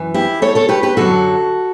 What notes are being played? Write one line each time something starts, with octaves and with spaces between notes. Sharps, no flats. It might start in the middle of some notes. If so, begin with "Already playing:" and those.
Already playing: F#2 E3
E4 G4
A4 C#5
A4 C#5
G4 B4
G4 B4
F#2 D3 F#3 F#4 A4